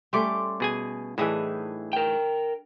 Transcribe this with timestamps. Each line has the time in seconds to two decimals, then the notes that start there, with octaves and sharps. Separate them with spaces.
0.13 G3 A3 C#4 C6 D6
0.60 B2 G#4 G#5
1.18 A2 E3 D4 D#4 G#4 D#5 E5
1.93 A#4 G5